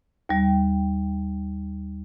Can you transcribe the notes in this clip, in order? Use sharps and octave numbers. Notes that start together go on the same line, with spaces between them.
D#2 G3